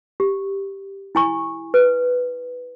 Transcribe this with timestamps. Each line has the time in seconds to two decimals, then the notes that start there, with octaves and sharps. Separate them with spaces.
0.20 G4
1.15 E4 G#5 C#6
1.74 B4